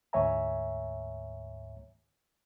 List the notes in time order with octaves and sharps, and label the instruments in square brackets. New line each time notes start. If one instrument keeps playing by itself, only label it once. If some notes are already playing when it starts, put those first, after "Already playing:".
[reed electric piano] D2 G#2 C#5 E5 G#5 A#5